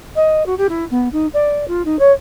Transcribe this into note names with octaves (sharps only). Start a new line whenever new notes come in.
D#5
F#4
G4
E4
B3
D#4
D5
F4
D#4
C#5